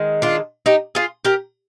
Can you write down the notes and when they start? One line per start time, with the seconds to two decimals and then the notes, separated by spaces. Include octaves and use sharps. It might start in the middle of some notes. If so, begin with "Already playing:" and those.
Already playing: D#3 G#3
0.22 D4 F4
0.66 D#4 G4
0.95 F4 G#4
1.25 G4 A#4